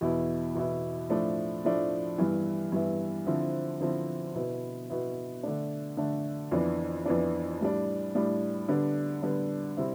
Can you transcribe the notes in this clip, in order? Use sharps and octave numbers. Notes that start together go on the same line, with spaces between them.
E2 B2 B3 E4
E2 B2 B3 E4
A2 F3 A3 D4
A2 F3 A3 D4
G2 E3 B3 E4
G2 E3 B3 E4
D3 F3 C4 E4
D3 F3 C4 E4
B2 B3 E4
B2 B3 E4
D3 A3 D4
D3 A3 D4
F2 E3 B3 D4
F2 E3 B3 D4
A2 G3 D4
A2 G3 D4
D3 G3 B3 D4
D3 G3 B3 D4
C3 G3 C4 E4